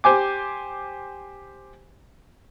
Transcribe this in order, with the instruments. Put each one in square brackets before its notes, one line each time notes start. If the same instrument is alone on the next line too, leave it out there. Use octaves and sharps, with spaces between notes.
[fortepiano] G4 C5 G#5 D6